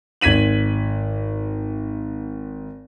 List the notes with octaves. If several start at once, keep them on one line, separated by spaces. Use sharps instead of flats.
G#1 G#6 B6 D#7 F#7